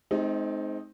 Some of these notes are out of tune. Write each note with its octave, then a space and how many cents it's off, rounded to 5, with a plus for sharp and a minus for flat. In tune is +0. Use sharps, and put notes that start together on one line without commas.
G#3 +45 C4 +0 D#4 +0